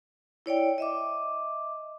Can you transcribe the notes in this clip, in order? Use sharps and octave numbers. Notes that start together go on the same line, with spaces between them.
E4 C#5 D5 G5
D#5 E5 D6